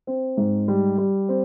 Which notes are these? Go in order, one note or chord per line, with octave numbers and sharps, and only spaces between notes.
C4
G#2
G3
G3
C4